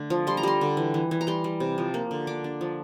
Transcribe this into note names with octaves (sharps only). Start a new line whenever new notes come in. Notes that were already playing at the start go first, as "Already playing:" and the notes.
Already playing: D3 A3
F3
G3 C6
A#5
G3 C6
D3
E3
E3
E3
A#5
G3 C6
G3
C3
F3
A#3
D3
D4 D6
D4
F3